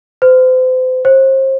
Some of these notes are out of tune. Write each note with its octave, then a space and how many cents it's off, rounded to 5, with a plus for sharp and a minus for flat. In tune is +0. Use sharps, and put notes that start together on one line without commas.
C5 -35
C5 +35